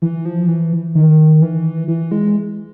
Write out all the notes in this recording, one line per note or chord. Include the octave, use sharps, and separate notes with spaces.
E3
F3
E3
D#3
E3
E3
G#3